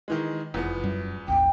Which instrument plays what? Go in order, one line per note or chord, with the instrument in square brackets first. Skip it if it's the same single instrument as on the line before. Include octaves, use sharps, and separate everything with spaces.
[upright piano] D#3 E3 G#3
[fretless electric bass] F1 [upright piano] E2 F3 B3
[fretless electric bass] F#2 G3
[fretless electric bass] A1 D#2 [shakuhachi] G5